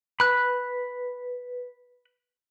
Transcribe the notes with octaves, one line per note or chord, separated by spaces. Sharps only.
B4 B5 F#6